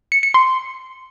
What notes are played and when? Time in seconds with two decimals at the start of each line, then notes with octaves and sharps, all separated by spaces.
0.12 C#7
0.23 C#7
0.34 C6